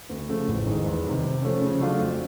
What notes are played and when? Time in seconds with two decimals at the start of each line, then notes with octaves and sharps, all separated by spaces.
0.09 D2
0.29 C#3 F3 A3
0.48 A1
0.67 G#2 D#3 G#3
0.86 E2
1.05 C3 D#3 G3
1.24 C3
1.42 F3 A3 C#4
1.61 C#3
1.80 F#3 A3 D4 F4
1.99 F2